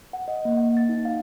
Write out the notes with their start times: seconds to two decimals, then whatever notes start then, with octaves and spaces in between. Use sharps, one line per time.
0.13 F#5
0.28 D#5
0.45 A#3
0.57 F#5
0.77 A6
0.89 D#4
1.05 F5